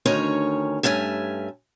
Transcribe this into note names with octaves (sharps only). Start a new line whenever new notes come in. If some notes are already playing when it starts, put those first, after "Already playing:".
D2 D#3 C#4 C#5 A#5
G2 A3 C#4 E5 G#5